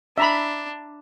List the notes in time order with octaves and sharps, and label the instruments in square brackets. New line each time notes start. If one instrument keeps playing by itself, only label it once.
[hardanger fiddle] D4 [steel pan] E5 A#5 B5